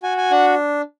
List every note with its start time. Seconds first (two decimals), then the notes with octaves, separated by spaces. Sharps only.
0.03 F#4 G#5
0.17 G#5
0.31 D4 F#5